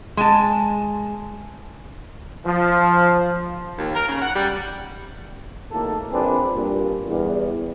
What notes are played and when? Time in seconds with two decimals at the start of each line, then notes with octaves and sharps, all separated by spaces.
0.17 G#3 G#5 A5
2.45 F3
3.77 D#2
3.95 A#4
4.08 C#3
4.22 F#5
4.36 G3
5.72 G#1 A2 D#3 A#3 A4
6.12 A#1 F3 C4 D4 G#4 B4
6.54 G2 A#2
7.07 E2 G3